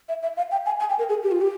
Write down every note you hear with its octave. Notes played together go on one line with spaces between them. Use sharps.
E5
E5
F5
G5
G#5
G#5
G5
A#4
G#4
G4
F4
G4